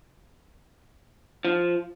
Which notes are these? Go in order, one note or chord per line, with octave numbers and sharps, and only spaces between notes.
F3